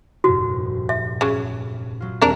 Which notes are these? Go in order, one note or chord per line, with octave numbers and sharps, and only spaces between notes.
F1 G2 A#2 F#4
E5
C#3 F#3
F#3 F4
D#2 G3 C4 D4 A#4